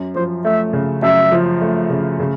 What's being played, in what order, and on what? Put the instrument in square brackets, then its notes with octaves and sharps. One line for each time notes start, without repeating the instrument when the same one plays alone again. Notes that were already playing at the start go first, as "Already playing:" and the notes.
Already playing: [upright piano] F#2
[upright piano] F3 [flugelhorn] C5
[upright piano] A3 [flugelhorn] E5
[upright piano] C#3
[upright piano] F#2 [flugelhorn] E5
[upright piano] F3
A3
C#3
C#3